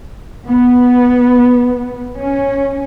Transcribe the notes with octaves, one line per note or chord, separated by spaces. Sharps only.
B3
C#4